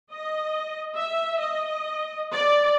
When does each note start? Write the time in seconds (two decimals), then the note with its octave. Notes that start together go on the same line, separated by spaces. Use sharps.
0.11 D#5
0.96 E5
1.39 D#5
2.32 D5